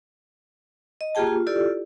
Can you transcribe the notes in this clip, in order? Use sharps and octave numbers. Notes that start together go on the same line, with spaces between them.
D#5
A#3 F4 G4 G#4 G5 A5
F4
E4 F4 G4 A4 D5